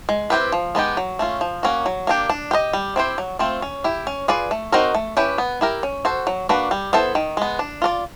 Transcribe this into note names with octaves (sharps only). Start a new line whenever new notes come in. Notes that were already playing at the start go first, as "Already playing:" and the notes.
G#3
C4 E4 G4 B4
F3
G#3 B3 D#4 G4
F#3
A3 C#4 F4
F3
A#3 C#4 F#4
F#3
A#3 D4 G4
D4
G4 B4 D#5
G3
C4 E4 G4 C5
F#3
A3 C4 F4
C#4
E4 G4
C#4
F4 G#4 B4 D5
A3
C4 D#4 F#4 A#4
A3
C#4 E4 G4 B4
B3
E4 G4 A#4
C#4
F#4 A4 C5
F#3
A#3 D4 F#4 B4
G3
B3 E4 A4 C5
D#3
G#3 B3
D4
F4 A#4 D5